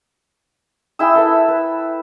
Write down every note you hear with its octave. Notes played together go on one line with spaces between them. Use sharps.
E4 G#4 G5 E6
A4 B4 E5
B4